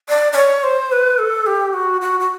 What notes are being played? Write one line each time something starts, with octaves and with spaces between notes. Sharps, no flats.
D5
D5
C#5
C5
B4
A4
G4
F#4
F#4
F#4